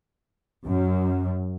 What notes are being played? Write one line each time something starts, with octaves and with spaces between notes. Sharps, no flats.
F#2